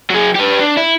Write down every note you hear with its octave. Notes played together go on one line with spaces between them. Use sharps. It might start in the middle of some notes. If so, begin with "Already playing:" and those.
F#3 G#4
G4 B4
D4
E4